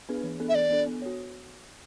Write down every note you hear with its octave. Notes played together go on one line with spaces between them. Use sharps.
B3 D4 G#4 B4
E3
B3 D4 A4
E5
E3 D5
B3 D4 A4
B3
F#4 C#5